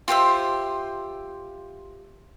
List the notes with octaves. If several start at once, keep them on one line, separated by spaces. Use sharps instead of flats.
F4 G4 C5 E5